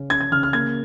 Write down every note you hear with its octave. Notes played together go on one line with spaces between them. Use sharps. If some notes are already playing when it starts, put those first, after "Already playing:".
Already playing: C#3 C#4
C#4 G#6
G#6
C#3 F6
F6
A#3 G#6